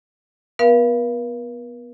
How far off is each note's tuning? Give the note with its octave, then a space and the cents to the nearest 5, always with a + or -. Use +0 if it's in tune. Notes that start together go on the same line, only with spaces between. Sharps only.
B3 -5 A#4 +45 F5 -30